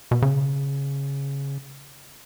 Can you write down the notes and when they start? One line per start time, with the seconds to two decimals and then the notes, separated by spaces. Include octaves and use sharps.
0.11 B2
0.22 C#3